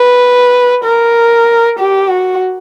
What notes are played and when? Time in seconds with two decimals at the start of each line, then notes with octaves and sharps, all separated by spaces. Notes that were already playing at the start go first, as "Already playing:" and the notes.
Already playing: B4
0.84 A#4
1.79 G4
2.10 F#4